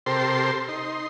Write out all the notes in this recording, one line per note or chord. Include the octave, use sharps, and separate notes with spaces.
C3 G4 A4 A#4 C5 C6
D#4 C6